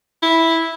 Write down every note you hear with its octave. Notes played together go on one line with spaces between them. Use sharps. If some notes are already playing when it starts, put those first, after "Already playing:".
E4